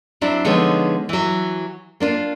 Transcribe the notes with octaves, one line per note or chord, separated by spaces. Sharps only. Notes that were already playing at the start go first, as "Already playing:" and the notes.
F#3 C4 D4 E4
D3 F3 G#3 B3 D#4 C#5
E3 F#3
A#3 D4 F4